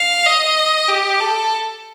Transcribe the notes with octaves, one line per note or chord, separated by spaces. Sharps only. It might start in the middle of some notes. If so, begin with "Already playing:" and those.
Already playing: F5
D#5
G4
A4